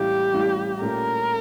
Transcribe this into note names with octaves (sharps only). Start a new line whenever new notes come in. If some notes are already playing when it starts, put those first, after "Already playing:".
Already playing: A1 A2 G3 A#3 G4
A1 A2 G3 A#3
A#2 A3 C#4 A#4